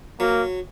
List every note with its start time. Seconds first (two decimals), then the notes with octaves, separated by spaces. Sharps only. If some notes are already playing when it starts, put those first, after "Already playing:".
0.20 F#3 A#3